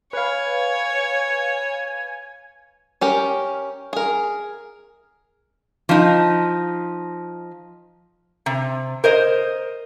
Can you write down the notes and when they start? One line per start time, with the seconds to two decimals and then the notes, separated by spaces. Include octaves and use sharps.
0.13 B4 C#5 F5 G#5
3.01 C#4 G4 A#4
3.93 G#4 A#4
5.89 F3 D#4
8.46 C3
9.04 A#4 C5 D#5